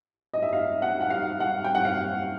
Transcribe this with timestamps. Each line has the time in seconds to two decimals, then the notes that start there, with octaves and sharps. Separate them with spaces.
0.34 D#5
0.42 E5
0.53 F5
0.82 F#5
1.01 F#5
1.10 F5
1.40 F#5
1.64 G5
1.75 F#5
1.85 F5